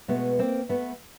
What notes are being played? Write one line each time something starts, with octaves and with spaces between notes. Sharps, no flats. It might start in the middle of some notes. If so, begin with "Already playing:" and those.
B2 G#3 A3 B3
A#3 C4
A3 B3